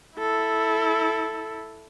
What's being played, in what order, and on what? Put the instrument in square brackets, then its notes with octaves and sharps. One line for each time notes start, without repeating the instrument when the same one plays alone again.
[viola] E4 A4